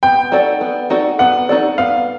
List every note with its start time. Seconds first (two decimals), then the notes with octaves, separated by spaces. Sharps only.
0.03 B3 G5
0.32 D#4 F#4 A4 D5
0.61 B3
0.90 D#4 F#4 A4 D5
1.19 B3 F#5
1.49 D#4 F#4 A4 D5
1.78 B3 F5